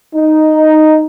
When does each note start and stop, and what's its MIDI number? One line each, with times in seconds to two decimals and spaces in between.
0.14 1.05 63